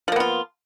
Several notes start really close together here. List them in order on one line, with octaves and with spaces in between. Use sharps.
F3 A#3 B3 F4